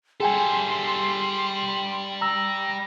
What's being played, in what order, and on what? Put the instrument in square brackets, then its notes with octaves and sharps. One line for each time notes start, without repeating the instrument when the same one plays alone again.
[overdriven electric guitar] G3 A4 [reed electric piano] G#4 G5 G#5 [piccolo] C6
[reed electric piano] A#5 E6 [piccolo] A#6